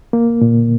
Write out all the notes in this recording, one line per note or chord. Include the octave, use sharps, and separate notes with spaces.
A#3
A#2